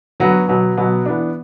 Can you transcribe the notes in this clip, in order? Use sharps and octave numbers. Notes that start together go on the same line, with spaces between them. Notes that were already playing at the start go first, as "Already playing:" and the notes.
G2 F#3 B3 F#4 B4
B2 F#3 B3
B2 F#3 B3
E3 B3 D4